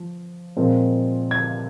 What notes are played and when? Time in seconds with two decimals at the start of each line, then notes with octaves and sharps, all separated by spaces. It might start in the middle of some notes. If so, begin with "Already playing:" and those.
Already playing: F3
0.56 A#2 F3 G#3 C4
1.31 G#6